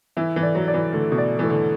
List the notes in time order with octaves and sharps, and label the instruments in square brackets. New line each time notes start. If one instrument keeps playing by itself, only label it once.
[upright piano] E3 [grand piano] E4
[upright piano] E3
[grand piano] D5
[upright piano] F#3
[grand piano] D5
[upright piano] E3
[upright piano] D3 [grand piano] A3
[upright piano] B2
[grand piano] D5
[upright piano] E3 [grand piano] A3
[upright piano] D3